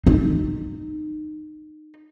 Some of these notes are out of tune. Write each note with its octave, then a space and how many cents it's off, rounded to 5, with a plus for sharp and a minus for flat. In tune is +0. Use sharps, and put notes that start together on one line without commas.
D#4 -25